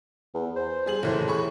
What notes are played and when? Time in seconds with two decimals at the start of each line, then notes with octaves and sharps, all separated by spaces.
0.34 E2
0.56 C5
0.86 G3 G#4 F#7
1.03 F#1 A2 E3 C6
1.28 G#4 B5 C#6